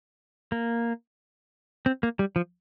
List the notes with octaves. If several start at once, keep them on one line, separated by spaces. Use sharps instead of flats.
A#3
C4
A#3
G3
F3